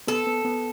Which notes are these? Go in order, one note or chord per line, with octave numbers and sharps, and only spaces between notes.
B3 A4
B3
B3